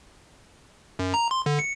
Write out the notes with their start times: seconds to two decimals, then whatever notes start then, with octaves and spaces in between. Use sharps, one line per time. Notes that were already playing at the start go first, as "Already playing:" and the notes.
0.99 F#2
1.14 A#5
1.31 C6
1.46 D3
1.59 C#7